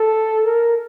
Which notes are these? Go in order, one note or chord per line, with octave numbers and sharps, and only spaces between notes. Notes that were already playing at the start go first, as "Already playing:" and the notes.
Already playing: A4
A#4